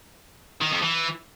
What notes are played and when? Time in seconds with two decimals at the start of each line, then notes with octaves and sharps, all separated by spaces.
0.61 D#3
0.72 F2
0.83 E3